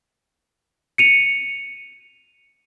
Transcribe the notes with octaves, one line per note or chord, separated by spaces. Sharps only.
C#7 D#7 F7